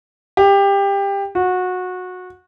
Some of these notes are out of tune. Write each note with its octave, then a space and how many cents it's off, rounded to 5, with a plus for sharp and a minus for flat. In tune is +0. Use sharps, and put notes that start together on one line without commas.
G4 +20
F#4 -20